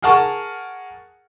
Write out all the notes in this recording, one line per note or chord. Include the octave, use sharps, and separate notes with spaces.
G#4 A#4 F#5 A5 C#6